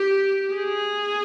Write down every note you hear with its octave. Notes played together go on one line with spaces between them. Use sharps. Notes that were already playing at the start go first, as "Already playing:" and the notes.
Already playing: G4
G#4